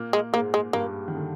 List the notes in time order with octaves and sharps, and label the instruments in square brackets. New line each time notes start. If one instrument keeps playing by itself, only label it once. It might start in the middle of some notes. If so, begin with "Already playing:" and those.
Already playing: [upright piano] A#2 A#3
[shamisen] G#3
[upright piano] G#2 G#3 [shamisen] A#3
[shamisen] G#3
[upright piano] G2 G3 [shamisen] A#3
[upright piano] D#3
D3